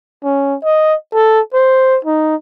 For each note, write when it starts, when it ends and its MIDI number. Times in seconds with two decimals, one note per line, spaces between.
0.24 0.55 61
0.64 0.95 75
1.14 1.40 69
1.54 1.98 72
2.05 2.35 63